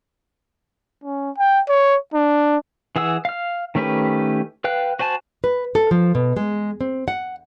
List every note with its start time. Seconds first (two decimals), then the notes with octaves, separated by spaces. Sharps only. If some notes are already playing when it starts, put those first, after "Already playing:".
1.04 C#4
1.38 G5
1.69 C#5
2.14 D4
2.96 E3 G#4 F#5 E6
3.25 F5 F6
3.75 D#3 A3 C#4 G4 B4
4.64 B4 F5 G5 F#6
4.99 F#4 C5 G#5 A5
5.44 B4
5.75 A4
5.91 F3
6.15 B2
6.36 G#3
6.81 C4
7.08 F#5